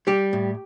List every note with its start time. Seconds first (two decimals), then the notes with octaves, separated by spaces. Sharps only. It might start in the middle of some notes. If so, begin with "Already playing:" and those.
0.07 G3 G4
0.33 A2